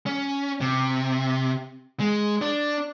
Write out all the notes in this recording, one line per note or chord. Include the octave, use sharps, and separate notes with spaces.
C#4
C3
G#3
D4